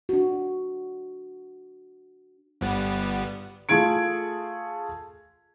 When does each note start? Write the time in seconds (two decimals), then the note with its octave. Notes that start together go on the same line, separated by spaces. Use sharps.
0.09 D4 F#4
2.61 G1 G3 B3
3.69 A3 F4 G#4 G#6 D7